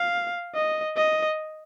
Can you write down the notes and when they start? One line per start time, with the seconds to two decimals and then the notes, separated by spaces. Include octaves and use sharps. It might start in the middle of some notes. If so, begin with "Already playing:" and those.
Already playing: F5
0.55 D#5
0.96 D#5